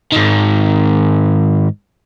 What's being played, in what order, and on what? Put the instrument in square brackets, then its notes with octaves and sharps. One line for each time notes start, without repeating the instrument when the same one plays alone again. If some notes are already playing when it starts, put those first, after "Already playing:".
[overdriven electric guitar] G#2 D#3